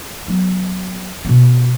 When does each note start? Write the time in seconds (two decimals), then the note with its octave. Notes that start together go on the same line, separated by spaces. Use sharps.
0.28 F#3 B3
1.25 B2 B3